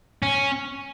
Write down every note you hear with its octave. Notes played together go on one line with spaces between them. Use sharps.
C#4